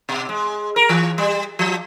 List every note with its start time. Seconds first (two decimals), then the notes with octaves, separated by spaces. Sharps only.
0.09 B2
0.29 G#3
0.76 A#4
0.89 E3
1.18 G3
1.59 F3